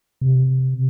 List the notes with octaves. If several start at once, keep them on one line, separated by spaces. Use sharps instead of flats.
C3